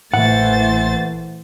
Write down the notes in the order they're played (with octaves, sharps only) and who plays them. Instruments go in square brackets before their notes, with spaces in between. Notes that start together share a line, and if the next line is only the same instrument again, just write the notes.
[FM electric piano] A1 E4 [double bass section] A#2 E3 A3 [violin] C5 A6 [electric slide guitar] F#5